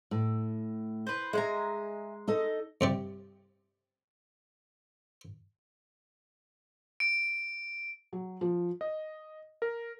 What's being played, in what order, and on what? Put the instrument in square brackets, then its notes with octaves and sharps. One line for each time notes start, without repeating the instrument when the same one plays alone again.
[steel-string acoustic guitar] A2
[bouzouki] B4 C5
[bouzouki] G#3 F#5 A#5 [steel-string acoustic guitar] E5 G#5
[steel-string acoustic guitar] D#4 A4 D#5
[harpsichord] G2 C3 G3
[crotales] D7
[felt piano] F#3
F3
[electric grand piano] D#5
A#4